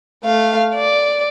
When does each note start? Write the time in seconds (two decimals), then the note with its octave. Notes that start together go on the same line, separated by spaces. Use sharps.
0.24 A3 F5
0.75 D5